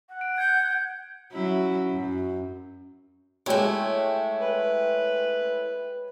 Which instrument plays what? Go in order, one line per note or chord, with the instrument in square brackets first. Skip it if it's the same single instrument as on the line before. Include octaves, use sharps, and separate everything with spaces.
[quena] F#5
[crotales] D7
[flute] G6 [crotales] G#6 C#7
[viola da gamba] F#3 C#4 E4
F#2
[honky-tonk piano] G#3 G4 C#5 [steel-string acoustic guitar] A3 E4
[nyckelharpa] B4